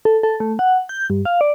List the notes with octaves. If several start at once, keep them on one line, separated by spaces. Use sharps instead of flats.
A4
A4
A3
F#5
G6
G2
F5
D5